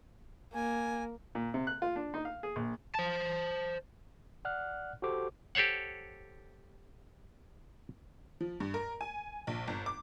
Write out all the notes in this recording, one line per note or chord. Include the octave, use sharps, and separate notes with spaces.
A#3 G#5
A#2
C3
F#6
F4
D4
D#4
F5
G#4
A#1
C5 A5
D5 F#5 F6 F#6
F#4 G4 A4 C5 D6
G4 A4 C5 C#5 F#5
F3
G2
A#4
G#5
A#1
G1
D6